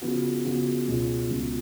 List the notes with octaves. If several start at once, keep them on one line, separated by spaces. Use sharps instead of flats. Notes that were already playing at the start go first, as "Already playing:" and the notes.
C#3 F3 B3 F#4
C#3 F3 B3 F#4
C#2 B2 G#3 C#4 F4
C#2 B2 G#3 C#4 F4